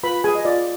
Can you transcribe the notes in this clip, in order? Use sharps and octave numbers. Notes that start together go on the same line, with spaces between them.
F4 B4 B5
G#4 G#5
D#5
F4 D5